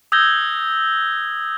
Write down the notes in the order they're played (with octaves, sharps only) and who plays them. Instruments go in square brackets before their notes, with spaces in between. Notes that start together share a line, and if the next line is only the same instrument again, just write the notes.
[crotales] D#6 E6 G6 G#6 A#6 G7